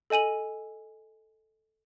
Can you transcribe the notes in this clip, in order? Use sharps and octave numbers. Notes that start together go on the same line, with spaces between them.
A4 D#5 G#5 D#7 F#7